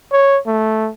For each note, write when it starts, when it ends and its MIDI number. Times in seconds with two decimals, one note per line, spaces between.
0.12 0.37 73
0.46 0.89 57